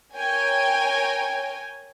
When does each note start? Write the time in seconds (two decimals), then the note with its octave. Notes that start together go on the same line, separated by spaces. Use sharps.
0.14 A#4 C#5 G5 G#5